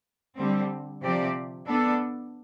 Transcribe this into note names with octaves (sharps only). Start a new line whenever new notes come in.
D3 G3 C4
C3 F3 C4 G4 D5
B3 D4 A4